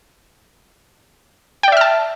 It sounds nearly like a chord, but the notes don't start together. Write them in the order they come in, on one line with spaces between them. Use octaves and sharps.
G5 D5 E5 F6 A5